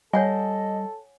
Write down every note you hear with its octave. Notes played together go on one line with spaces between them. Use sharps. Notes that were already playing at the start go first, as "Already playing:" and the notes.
G3 A4 C#5 D#5 F#5 G#5